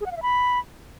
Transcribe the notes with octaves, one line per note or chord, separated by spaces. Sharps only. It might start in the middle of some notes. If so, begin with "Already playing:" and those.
G#4
F#5
F5
E5
B5